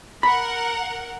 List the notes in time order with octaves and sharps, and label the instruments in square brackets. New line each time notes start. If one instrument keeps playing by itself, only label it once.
[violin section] A#4 F#5 [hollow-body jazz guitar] B5